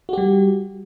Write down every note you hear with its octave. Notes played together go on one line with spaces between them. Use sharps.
G3 F#4 G4